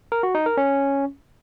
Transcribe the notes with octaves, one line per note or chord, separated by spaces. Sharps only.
A#4
F#4
D#4
A#4
C#4